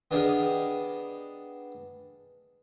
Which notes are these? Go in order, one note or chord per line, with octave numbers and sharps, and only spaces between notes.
B3 D4 G4 G#4 A#4 D#5